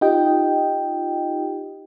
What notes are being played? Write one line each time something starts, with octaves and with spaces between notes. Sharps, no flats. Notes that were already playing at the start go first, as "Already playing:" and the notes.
D#4 F4 G4 D#5 G5